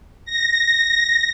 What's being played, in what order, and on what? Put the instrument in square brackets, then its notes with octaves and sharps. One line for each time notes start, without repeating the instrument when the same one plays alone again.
[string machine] A#6